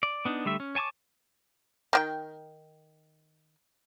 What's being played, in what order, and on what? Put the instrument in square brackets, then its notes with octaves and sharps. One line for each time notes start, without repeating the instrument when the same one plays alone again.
[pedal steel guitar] D5
B3 D4 D#4
D3 G3 A3 E5
C#4
C#5 G#5 A5 C#6 D6
[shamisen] D#3 G4 G5